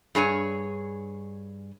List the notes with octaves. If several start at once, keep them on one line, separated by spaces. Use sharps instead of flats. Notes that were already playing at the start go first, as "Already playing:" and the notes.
G2 G#4 C#5 G#5